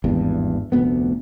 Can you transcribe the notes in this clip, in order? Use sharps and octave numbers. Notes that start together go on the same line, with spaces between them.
G#1 E2 G2
F1 D2 B3